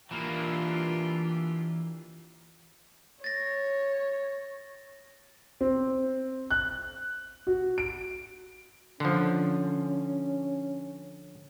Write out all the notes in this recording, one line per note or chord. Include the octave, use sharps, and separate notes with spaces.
E3 A#3 D4 F4 G4
C#5 A6 A#6
C4
F#6
F#4
D7
D3 F3 C#4